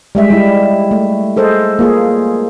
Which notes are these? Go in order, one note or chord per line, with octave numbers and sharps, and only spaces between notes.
G3 G#3 E5
G3 E4
A3
G#4 A4 C5 D#5
A#3 F4 G#4